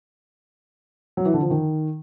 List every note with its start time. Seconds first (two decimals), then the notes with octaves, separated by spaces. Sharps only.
1.17 F#3
1.25 E3
1.34 D3
1.42 F3
1.50 D#3